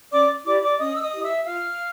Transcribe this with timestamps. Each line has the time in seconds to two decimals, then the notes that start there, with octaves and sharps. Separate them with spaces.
0.12 C#4 D5 D6
0.46 E4 G4 D5 D6
0.62 D5 D6
0.79 C#4 D#5 D#6
0.96 E6
1.01 D#5 D#6
1.12 E4 G4
1.24 E5 E6
1.46 F4 F5 F6